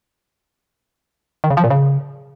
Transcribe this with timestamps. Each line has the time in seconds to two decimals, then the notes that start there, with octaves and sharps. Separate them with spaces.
1.44 D#3
1.50 C#3
1.57 F3
1.64 A#2
1.70 C#3